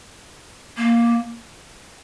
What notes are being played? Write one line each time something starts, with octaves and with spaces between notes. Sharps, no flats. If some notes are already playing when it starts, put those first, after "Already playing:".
A#3